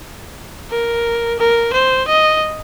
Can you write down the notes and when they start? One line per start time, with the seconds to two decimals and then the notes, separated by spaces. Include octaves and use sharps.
0.71 A#4
1.39 A#4
1.73 C5
2.08 D#5